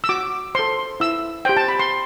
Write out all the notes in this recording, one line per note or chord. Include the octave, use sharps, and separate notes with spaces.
E6
F#4 D6
A4 C5 C6
E4 E6
G4 C5 G5
A5
B5
C6